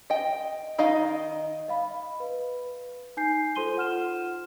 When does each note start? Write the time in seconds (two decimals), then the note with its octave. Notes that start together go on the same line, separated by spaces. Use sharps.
0.10 D#5 G5
0.78 D#3 D#4 D#5 F5
1.68 D#5 F5 B5
2.20 B4
3.17 D#4 G#5 G6 C7
3.56 F4 A4 C5 C6 D#7 G7
3.76 F4 F#5 F6 E7